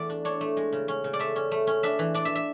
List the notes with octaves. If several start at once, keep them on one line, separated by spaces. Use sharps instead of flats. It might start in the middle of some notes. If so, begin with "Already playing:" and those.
Already playing: E2 A3 D5
D4
D4 C#5
A3
G#3
C#3
C#4
C#3
D5
A3 E5
C#4
A3
C#4
D4 E5
E3
D4 D5
E5
E5